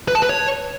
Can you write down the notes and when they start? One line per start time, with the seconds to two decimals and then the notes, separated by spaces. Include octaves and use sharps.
0.08 B4
0.15 A5
0.22 B4
0.29 C#5